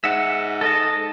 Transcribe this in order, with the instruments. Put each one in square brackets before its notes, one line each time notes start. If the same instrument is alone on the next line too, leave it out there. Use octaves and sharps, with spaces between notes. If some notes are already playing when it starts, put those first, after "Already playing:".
[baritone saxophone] G#2 [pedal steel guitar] E5 F#5
[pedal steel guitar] A4 D#5 A5